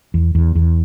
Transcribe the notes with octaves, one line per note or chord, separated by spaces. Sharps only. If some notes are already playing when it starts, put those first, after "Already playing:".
E2
E2
E2